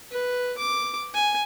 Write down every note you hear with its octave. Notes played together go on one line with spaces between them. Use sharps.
B4
D6
G#5